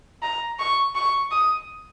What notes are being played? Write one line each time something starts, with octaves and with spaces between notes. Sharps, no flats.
A#5
C#6
C#6
D#6